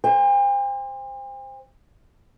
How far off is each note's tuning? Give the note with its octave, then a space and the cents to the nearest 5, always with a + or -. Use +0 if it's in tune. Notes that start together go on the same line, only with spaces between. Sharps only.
C5 +0 G5 +45